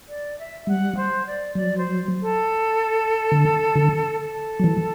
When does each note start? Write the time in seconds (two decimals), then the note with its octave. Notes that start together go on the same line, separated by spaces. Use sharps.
0.08 D5
0.39 E5
0.67 G3 F#5
0.97 C5
1.26 D5
1.55 F#3 D5
1.77 C5
2.21 A4
3.32 D3
3.76 D3
4.20 A4
4.59 F#3
4.64 E3